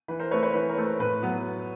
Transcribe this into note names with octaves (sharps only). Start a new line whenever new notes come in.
E3 B4
A#4 C5
A3 C4 B4 C#5
B4 C#5
E3 B4
A#4
A3 C4
B4
A2 B4
F#3 B3